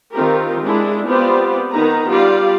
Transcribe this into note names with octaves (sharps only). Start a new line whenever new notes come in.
D#3 C4 F4 G4 A#4
G#3 D4 E4
B3 C4 F4 G4 C5 D5
D#3 B3 D#4 A#5
G3 F4 G4 D5 F5